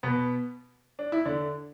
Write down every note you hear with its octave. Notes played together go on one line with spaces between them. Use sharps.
B2 B3
D4
E4
D3 D4